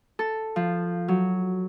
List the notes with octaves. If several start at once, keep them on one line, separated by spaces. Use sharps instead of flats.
A4
F3
F#3